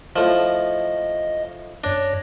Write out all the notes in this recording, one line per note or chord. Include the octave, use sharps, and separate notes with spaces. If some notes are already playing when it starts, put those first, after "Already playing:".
A2 F3 D#5
F#2 D4 C#5 A#6